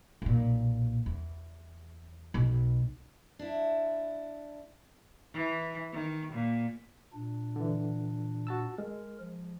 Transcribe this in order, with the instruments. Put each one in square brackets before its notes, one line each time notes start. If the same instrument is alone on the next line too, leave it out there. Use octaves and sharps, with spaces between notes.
[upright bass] B1 A#2
E2
B1 B2
[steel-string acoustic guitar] D4 E4
[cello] E3
D#3
A#2
[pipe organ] A#2 D4
[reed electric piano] D3 E3
F#4 A5 E6
[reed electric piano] G#3 [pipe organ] A#4
[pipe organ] F3